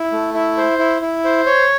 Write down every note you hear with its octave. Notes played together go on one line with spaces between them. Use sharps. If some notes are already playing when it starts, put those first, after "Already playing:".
Already playing: E4
A3
E4
C5
E4
E4
C5
C#5